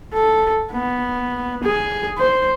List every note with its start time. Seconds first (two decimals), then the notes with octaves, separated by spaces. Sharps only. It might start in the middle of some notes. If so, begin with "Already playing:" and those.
0.14 A4
0.72 B3
1.63 G#4
2.18 C5